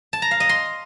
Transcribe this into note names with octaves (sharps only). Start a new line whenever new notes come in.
A5
A#5
F5
D#5
C6